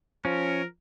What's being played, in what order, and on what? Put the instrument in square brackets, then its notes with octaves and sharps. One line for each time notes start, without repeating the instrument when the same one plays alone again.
[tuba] F3 [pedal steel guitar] C#4 [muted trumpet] A#4